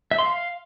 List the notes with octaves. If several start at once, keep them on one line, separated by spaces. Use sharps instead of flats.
E5
C6
F5